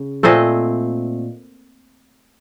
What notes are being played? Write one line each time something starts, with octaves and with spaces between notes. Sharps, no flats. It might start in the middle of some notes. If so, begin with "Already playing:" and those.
Already playing: C#3
A#2 A3 C4 C5 D#5